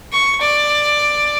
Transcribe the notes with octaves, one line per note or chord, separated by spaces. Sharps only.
C#6
D5